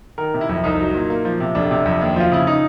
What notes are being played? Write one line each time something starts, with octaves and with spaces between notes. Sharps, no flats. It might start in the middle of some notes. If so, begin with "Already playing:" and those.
D#3 A#4
C3
E4
F2
C2 D#4
F#3
A#2
A#3
F3
C3
F1 D4
C3
F2
D#2
F3 F4
C#3 E4
D#4